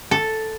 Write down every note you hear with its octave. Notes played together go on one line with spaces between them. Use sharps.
A4